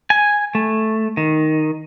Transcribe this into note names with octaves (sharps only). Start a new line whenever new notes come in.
G#5
A3
D#3